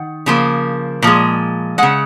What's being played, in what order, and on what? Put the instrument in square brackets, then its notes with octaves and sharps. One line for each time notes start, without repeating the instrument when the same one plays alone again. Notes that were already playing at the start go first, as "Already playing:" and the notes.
Already playing: [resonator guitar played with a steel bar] D#3 F#5
C#3 F3 A#3
A#2 F3 G#3
C#3 G#3 F#5